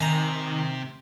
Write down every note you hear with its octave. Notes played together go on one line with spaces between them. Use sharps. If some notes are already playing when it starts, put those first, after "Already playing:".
C3 D#3 G#5 A#5